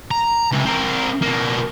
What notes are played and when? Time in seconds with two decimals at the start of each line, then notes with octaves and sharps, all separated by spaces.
0.11 A#5
0.51 C#2 C3
0.65 C4 A#4
1.22 B2 A#3